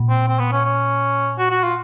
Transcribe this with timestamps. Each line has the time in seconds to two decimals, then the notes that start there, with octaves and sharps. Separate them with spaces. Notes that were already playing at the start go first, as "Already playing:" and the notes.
Already playing: A#2
0.09 C4
0.28 C4
0.39 B3
0.52 C#4
0.64 C#4
1.38 F#4
1.50 F#4
1.63 F4